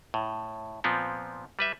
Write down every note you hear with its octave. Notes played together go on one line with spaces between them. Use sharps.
A2
A#2 F3 B3 C4
G3 B4 E5